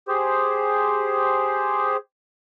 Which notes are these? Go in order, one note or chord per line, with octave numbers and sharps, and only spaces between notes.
G4 G#4 C5